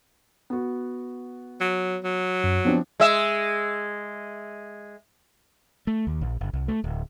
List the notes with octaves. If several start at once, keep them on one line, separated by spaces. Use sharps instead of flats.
B3 F#4
F#3
F#3
F#2
F3 B3 C4 D4
G#3 E5
A3
D#2
A#1
F#1
C2
A3
D1